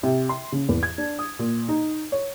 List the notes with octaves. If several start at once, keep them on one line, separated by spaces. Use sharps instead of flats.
C3
C6
C#3
E2
G#6
D4
D#6
A#2
D#4
C#5